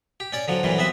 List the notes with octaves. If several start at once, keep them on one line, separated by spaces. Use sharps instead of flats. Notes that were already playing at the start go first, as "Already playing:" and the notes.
G4
C#4 D5 D6
D3 F3 F#3
F2 A#2 E3 F#3 G3
B3 C4 B4 E5